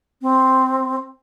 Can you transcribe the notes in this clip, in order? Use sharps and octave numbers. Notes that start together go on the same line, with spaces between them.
C4